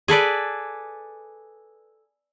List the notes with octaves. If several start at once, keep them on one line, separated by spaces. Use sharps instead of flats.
G#4 A4 B4 D5